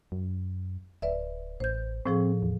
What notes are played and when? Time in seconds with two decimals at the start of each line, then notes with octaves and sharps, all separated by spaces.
0.12 F#2
1.02 D1 B4 D5 E5
1.60 A1 C5 G6
2.06 A2 F3 C4 G#4
2.43 E2